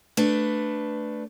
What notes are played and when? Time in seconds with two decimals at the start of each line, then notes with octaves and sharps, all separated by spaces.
0.17 A3 D4 B4